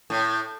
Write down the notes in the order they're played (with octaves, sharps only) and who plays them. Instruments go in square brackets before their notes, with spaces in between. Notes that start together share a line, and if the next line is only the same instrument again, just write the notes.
[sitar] A2